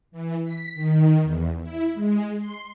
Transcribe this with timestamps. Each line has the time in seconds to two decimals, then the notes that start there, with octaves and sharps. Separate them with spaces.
0.12 E3
0.44 B6
0.75 D#3
1.23 E2
1.61 E4
1.94 G#3
2.40 C6